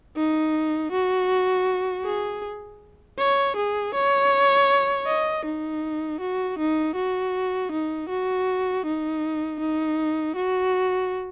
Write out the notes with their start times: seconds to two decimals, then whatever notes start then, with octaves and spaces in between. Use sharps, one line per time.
0.16 D#4
0.92 F#4
2.05 G#4
3.18 C#5
3.56 G#4
3.94 C#5
5.07 D#5
5.45 D#4
6.21 F#4
6.58 D#4
6.95 F#4
7.72 D#4
8.09 F#4
8.85 D#4
9.60 D#4
10.36 F#4